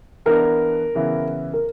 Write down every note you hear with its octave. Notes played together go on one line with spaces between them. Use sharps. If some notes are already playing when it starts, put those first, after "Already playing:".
E3 B3 D4 A#4
C#3 E3 B3 E4
A#4